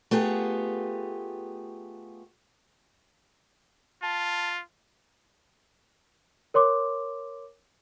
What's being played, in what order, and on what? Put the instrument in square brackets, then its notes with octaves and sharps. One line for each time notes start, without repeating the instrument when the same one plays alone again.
[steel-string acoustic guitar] A3 B3 F4 G4 G#4
[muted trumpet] F4 [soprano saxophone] A5
[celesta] A#4 C#5 C6 D6